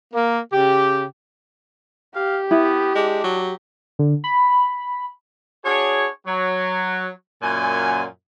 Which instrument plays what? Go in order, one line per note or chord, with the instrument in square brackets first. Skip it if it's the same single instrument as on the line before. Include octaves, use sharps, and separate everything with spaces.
[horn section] A#3
C#3 G4
[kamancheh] G4 [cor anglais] F5
[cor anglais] B3 [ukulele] E4
[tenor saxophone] G#3 [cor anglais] D4
[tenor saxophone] F#3
[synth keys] D3
B5
[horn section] D4 F#4 G#4 C#5
F#3
F#2 A#2 G#5